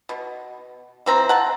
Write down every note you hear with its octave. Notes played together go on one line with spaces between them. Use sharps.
B2
E3 C4 A#5
F#5 A5